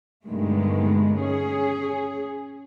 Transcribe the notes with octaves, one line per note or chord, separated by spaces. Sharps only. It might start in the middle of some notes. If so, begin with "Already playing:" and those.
G2 B2 D3 D#3 G#3 A3
C#4 G#4